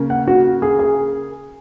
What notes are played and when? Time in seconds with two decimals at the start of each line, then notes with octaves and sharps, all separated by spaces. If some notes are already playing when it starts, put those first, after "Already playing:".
Already playing: C#3 A#3
0.10 F#5
0.28 F#4
0.62 G#4
0.79 G#4